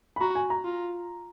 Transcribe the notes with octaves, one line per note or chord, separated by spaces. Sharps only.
B5
F#4 A#5
G#5
A#5
F4